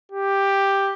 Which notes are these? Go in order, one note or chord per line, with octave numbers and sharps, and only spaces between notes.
G4